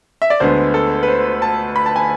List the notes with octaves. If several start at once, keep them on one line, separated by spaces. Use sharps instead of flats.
E5
D5
D2 D3 G#3 B3 C5
A4
B4
C5
A5
B5
A5
G#5